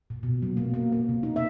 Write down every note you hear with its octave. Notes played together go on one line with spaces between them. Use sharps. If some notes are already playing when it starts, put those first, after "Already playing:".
A#2
B2
F#3
A#3
A#3
A#3
C3
D#4
E5